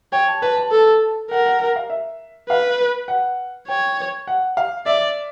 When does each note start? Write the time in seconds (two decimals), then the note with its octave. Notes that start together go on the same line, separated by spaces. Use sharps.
0.13 C#5 G5
0.28 A5
0.42 B4 A5
0.57 A5
0.72 A4
1.31 A#4 F#5
1.46 F#5
1.60 F#5
1.76 F5
1.90 E5
2.49 B4 F5
3.08 F#5
3.68 C#5 G5
4.27 F#5
4.57 F5
4.86 D5 E5